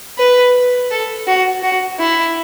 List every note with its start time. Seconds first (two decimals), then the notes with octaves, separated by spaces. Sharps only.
0.18 B4
0.91 A4
1.28 F#4
1.63 F#4
2.00 E4